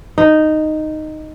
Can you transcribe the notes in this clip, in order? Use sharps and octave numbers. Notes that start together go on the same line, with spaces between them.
D#4